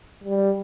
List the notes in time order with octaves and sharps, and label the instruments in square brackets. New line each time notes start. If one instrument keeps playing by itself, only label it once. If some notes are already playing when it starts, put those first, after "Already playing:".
[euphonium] G3